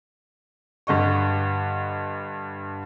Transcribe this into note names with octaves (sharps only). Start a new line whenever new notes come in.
G2 D3 D#5 C#6